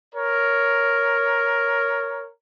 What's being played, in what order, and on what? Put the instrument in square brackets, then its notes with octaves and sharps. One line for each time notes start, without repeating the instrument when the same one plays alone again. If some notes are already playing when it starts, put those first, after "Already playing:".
[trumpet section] A#4 C#5